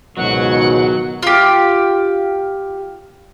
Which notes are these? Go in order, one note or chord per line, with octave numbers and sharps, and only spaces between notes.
C#2 G#2 B2 D#3 F#3 F#5
F4 G4